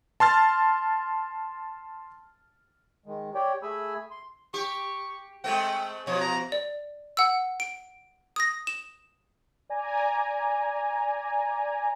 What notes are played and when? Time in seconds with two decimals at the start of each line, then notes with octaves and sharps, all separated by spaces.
0.20 A5 C6 F6 A6
3.06 D#3 G#3
3.35 G4 C#5 D5 G5
3.63 A3 G#4 G#5 B5 E6
4.11 C6
4.54 G4 C#6
5.44 G#3 A3 C4 G5
6.07 B2 F3 C#5
6.21 A#5
6.52 D5
7.17 F#5 E6
7.60 D7
8.36 D#6 A#6
8.67 E7
9.70 D5 G#5 A#5